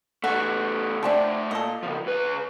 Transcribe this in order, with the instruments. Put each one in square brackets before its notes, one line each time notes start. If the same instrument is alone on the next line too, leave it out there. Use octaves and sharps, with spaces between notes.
[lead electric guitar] E2 A3 [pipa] F#4
[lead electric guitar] C#3 A3 [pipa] F3 C4 D4
[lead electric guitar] A#2 [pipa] A4 D#5
[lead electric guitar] C#3 F3
C#2 B4